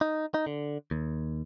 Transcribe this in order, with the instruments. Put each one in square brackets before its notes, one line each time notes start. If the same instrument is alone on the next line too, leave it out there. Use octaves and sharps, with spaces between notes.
[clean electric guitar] D#4
D#4
D3
D#2